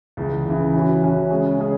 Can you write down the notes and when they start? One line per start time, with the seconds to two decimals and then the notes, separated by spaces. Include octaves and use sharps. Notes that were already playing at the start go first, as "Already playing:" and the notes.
0.17 C#2 C#3 E3
0.46 C#2 C#3 E3
0.74 E3 C#4 F#4
1.03 E3 C#4 F#4
1.30 C#3 G#3 C#4 G#4
1.59 C#3 G#3 C#4 G#4